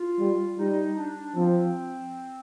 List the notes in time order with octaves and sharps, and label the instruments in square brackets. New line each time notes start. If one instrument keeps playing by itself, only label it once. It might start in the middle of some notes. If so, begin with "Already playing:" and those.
Already playing: [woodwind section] F4
[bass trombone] G3
[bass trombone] G3 [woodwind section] D#4
[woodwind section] D4
[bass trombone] F3 [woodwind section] C4